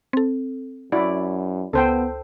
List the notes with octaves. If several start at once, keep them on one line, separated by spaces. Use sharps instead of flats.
C4 A4
F#2 E4 F#4 D5
C#2 B3 A4 C5 G5